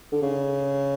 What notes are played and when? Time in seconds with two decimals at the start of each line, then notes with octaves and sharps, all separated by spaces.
0.12 D3
0.22 C#3